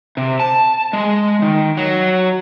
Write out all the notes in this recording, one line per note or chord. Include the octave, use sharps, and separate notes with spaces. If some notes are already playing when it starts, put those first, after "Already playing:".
C3
A5
G#3
D#3
F#3